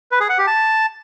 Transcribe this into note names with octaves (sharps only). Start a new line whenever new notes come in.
B4
G#4
F#5
G4
A5